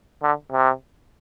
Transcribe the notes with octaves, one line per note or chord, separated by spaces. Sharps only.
D3
C3